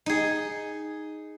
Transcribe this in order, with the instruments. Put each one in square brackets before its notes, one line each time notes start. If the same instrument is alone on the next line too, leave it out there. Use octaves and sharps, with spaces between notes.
[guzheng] D#4 G#4